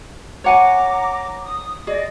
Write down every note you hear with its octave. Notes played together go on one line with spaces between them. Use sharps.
C#5 F#5 G#5 A#5 D6
D#6
G#4 D5 D#5